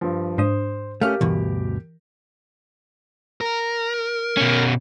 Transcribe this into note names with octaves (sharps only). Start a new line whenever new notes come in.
G2 F3
G#2 D4 C5 D#6
A3 C#4 G4 A#4 F5 F6
D2 G2 B2 E3
A#4
B2 C#4